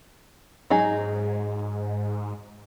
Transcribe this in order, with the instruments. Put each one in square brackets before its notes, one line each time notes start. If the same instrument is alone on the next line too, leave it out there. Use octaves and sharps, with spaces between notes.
[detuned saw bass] G#2 [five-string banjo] F#3 D#4 G#4